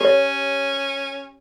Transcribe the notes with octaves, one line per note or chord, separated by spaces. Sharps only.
C#4 G4 C#5